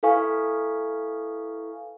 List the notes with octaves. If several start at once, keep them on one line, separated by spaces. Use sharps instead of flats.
E4 A4 B4 F5 G#5 C#6